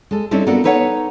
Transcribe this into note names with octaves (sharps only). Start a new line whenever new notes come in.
G#3 A4
G3 C4 C#4 D#4 E4 A4
B3 D4 F4 F#4 A4 A#4
D#4 A4 B4 C#5 E5 F#5